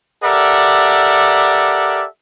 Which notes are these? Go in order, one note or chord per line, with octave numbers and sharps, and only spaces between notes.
G4 A4 A#4 D5 E5 F#5